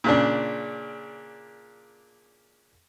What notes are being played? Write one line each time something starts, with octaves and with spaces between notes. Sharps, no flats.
A#2 C#3 D4